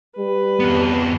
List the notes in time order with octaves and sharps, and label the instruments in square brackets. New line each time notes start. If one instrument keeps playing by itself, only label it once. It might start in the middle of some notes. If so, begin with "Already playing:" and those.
[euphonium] G3 [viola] B4
[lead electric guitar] F2 B3